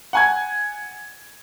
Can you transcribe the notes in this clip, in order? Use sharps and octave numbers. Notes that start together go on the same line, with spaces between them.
F#5 G#5 G#6